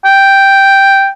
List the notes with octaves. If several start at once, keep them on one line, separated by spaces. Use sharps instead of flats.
G5